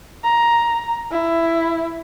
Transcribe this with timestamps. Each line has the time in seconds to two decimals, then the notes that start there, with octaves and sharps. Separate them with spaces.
0.24 A#5
1.11 E4